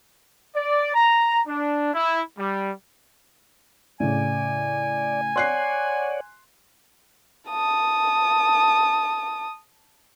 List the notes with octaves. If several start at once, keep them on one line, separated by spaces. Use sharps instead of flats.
D5
A#5
D4
E4
G3
A2 C#3 D5 G#5
C#5 D5 F#5 C6 F#6 C7
A5 D#6